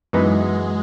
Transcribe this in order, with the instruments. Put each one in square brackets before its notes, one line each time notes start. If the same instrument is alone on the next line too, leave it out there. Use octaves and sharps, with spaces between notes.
[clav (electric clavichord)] F#2 E3 B3 D#4 [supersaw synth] G#3